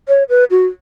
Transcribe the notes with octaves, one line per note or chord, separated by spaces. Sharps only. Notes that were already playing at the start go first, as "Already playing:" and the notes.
C#5
B4
F#4